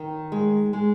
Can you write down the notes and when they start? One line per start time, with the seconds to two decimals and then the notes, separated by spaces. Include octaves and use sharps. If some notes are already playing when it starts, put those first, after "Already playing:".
Already playing: D#3
0.32 G#3
0.73 G#3